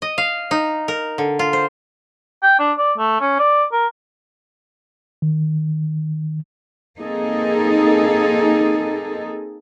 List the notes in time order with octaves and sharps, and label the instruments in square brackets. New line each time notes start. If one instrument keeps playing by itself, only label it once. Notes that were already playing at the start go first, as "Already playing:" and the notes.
[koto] D#5
F5
D#4
A#4
D3
F4
C5
[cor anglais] G5
D4
D5
A3
C#4
D5
A#4
[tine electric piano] D#3
[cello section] A#3 C4 D#4 G#4 A4